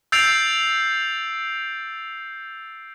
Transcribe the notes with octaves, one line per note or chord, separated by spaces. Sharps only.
E6 G6 A6 C7 D7 F7